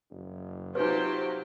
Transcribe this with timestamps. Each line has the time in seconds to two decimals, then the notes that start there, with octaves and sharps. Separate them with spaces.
0.11 F#1
0.75 C3 F#3 D#4 F4 G4 B4 C5